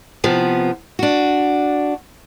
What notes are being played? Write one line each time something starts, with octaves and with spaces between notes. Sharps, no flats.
C3 F3 B3
D4 F#4